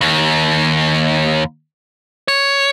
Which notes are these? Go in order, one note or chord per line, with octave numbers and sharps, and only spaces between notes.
D#2
C#5